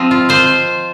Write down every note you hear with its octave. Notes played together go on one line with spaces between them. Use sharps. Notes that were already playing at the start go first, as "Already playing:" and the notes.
Already playing: F3 C4 D#5
F4
F3 C5